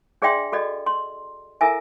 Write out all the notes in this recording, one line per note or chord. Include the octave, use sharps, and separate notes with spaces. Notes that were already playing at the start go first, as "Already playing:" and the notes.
D4 G#4 D5 E5 G5 C6
F#4 A4 D5 D#5
C6
E4 A4 A#4 E5 G#5